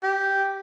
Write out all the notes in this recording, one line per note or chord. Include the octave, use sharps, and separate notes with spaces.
G4